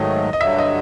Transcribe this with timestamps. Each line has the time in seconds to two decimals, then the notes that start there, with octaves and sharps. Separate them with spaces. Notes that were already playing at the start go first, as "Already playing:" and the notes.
Already playing: G#2 D#3 F#3 A3 D#5
0.33 D#5
0.40 G2 D3 F#3 E5
0.58 D#5